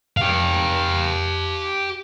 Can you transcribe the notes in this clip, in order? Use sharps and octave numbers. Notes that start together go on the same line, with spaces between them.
G4 F5